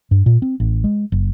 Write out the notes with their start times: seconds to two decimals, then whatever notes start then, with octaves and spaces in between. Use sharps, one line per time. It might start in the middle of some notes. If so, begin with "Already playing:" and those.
0.11 G2
0.26 A#2
0.42 C4
0.60 A1
0.84 G#3
1.12 F#1